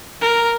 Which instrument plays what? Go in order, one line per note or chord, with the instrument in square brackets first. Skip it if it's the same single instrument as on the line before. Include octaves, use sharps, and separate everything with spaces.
[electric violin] A#4